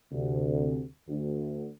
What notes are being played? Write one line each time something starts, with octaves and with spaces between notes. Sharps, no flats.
D2 C3
D2